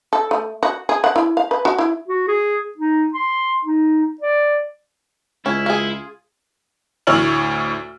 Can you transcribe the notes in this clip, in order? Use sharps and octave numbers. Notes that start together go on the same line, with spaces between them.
A4
A3
F#4
G#4
F#5
E4
F5
B4
F#4
E4
F#4
G#4
D#4
C6
D#4
D5
C#2 C#4 E4
F4 G#4
D2 A2 C#5 E6 F6 F#7